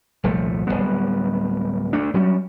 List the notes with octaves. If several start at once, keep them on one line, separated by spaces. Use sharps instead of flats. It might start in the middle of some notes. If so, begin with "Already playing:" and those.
D#1 C2 F3 A3
D1 D2 G3 B3
D2 A3 D4
F#3 G3 C#4